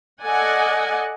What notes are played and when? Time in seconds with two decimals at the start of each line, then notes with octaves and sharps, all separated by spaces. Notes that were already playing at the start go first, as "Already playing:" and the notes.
0.24 A4 D5 D#5 F#5 G#5